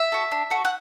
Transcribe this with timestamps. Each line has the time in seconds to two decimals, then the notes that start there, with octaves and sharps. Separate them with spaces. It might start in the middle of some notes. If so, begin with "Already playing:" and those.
Already playing: E5
0.12 F#4 A4
0.31 D4
0.50 F#4 A4
0.65 F#5